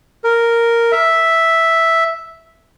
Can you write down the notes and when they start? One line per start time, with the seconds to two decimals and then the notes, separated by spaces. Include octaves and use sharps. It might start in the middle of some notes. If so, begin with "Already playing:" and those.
0.24 A#4
0.92 E5